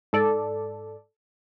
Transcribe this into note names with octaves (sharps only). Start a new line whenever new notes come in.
G#2 A4 D5